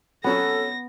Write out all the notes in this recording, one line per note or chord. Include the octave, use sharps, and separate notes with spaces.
F#3 B3 C#4 F#4 A4 A#6